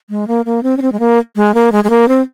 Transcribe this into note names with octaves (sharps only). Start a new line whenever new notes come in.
G#3
A#3
A#3
C4
C#4
C4
G#3
A#3
G#3
A#3
G#3
G#3
A#3
C4